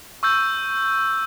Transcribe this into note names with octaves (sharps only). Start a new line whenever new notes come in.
C#6 E6 G6